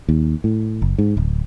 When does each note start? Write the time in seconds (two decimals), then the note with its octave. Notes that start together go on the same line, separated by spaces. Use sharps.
0.09 D#2
0.44 A2
0.82 F#1
0.98 G#2
1.17 D1